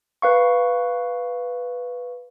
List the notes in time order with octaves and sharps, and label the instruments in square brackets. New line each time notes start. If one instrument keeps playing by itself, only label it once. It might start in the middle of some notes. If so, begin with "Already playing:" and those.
[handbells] B4 F5 C#6